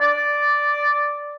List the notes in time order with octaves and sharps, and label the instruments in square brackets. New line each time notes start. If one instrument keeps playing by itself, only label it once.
[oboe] D5